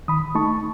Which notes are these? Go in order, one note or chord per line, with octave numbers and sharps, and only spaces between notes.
D#3 B5 D#6
A3 D#4 A5 C#6